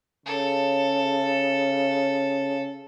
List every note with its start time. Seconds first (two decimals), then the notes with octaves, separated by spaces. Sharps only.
0.26 C#3 A4